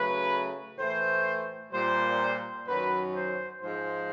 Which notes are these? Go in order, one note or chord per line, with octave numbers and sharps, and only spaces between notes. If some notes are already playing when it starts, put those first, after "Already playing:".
Already playing: C#3 F#3 A3 B4
A2 E3 A3 C5
A#2 G3 C5
F#2 D#3 F#3 B4
C5
G#2 F3 G#3 C5